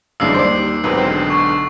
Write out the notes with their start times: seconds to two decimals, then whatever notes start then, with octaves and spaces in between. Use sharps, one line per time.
0.20 G1 F#2 E3 G#3 D4 F5 E6 C7
0.35 D#2 G3 C5 D5
0.84 B1 G#2 B2 C4 A#4 B4
0.98 D3 C4
1.30 C#6